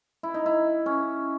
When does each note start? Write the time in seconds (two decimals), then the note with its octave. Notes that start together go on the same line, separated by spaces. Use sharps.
0.23 E4
0.34 D#4
0.46 E4
0.86 C#4